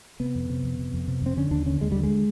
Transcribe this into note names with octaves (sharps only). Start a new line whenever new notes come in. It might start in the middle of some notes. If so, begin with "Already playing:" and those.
C3 B3
F2
C3
F2
C3
F2
C3
F2 C4
D3 C#4
D#2 D4
D3 C#4
D#2 G#3
D3 G3
G#3